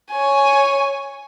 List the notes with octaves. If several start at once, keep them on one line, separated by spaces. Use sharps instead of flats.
C#5 G#5